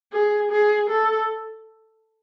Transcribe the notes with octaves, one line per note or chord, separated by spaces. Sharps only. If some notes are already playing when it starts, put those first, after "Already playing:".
G#4
G#4
A4